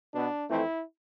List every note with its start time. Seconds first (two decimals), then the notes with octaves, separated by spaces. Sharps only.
0.13 B2 B3 D4
0.48 F2 E3 A3 C4 E4